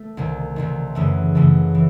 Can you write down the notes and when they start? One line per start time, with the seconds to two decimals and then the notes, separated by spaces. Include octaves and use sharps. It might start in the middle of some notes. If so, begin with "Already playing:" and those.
Already playing: A3
0.17 C2 C3 D#3
0.56 C2 C3 D#3
0.95 F#2 C#3 E3 A3
1.35 F#2 C#3 E3 A3
1.75 E3